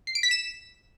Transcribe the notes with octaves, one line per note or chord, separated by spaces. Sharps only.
C7
D7
B6
E7